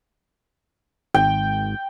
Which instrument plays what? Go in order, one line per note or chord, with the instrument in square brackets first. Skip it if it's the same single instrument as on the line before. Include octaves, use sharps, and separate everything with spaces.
[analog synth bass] G#1 [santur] G5